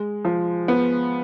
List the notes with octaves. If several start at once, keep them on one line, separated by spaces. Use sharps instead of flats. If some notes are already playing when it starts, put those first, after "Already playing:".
Already playing: G#3
F3
B3